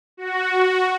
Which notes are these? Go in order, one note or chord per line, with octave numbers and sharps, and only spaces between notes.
F#4